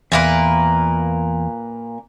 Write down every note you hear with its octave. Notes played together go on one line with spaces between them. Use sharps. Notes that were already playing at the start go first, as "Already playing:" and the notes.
E2 A#2 A#3 B4 E5